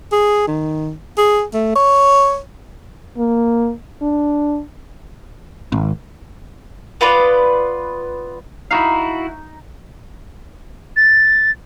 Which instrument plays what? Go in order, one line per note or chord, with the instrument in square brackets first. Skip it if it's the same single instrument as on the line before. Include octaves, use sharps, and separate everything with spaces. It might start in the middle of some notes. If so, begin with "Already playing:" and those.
[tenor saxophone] G#4
D#3
G#4
A3
C#5
[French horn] A#3
D4
[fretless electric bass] G#1
[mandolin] B3 F4 B4 D5
[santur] D#4 [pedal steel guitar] E4 F#4 F5
[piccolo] A6